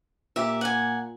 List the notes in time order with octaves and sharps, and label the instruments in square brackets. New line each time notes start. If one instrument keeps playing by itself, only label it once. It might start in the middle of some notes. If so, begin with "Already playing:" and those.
[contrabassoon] A#2 [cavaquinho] G4 E5
[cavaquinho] F#5 G#5